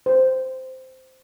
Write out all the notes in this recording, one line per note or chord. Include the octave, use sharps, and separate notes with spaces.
C5